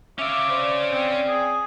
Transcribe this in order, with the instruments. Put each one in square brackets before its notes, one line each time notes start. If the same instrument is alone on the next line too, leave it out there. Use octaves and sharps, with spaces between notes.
[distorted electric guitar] C#4 F5 [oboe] E5 [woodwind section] D6
[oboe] C5 [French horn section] D5
[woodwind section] C4
[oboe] G#4